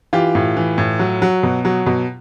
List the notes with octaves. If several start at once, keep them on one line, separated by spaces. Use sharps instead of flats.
E3 F4 G4
A2
E3
A2
F#3
F#3
B2
F#3
B2